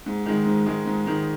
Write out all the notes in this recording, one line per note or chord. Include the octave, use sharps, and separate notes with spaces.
G#2
D#3 G#3
G#2
D#3 G#3
G#2
D#3 G#3